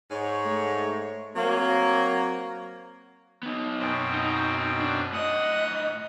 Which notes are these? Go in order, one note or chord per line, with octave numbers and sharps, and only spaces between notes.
G#2 C#5
A3
F#3 A#3 C4
B3 D#4
F#2 B2 C4
D#4
D4
A2 D#5 F#5 D#6